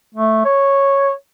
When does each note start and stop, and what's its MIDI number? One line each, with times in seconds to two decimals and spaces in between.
0.15 0.41 57
0.45 1.12 73